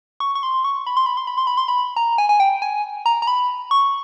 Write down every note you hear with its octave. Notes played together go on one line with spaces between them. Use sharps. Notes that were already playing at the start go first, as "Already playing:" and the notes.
C#6
C#6
C6
C#6
B5
C6
B5
C6
B5
C6
B5
C6
B5
A#5
G#5
G#5
G5
G#5
A#5
A#5
B5
C#6